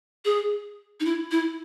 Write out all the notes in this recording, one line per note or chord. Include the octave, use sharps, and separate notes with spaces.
G#4
D#4
E4
E4